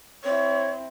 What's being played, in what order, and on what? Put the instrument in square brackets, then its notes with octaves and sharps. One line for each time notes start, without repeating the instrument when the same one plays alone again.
[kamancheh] C4 E4 [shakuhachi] C#5